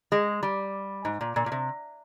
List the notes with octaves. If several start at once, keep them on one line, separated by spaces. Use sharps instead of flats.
G#3
G3
G#2
A#2
A#2
A#2
C3